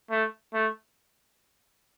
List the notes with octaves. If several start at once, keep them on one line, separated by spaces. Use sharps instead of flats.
A3
A3